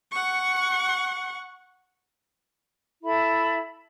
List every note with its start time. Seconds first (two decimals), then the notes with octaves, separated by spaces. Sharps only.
0.12 F#5 C#6
3.03 E4 A4 E5 B5